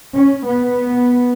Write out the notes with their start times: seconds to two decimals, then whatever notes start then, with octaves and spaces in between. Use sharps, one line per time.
0.15 C#4
0.47 B3